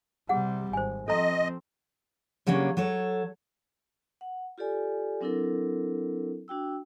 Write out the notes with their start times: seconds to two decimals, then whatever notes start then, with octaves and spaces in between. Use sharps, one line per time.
0.29 C3 G3 G#4 F#5
0.73 G#1 C5 G#5
1.08 F3 C4 A4 D#5 A#5
2.46 C#3 F#3 G3 A#3 C#4 D4
2.77 F#3 A4 C#5
4.21 F#5
4.58 F4 G4 A4 D5 G#5
5.21 F#3 C4 D4 E4 A4 A#4
6.48 D4 F#4 G5 E6